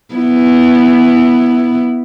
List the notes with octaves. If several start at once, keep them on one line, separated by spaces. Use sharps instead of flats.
B3 E4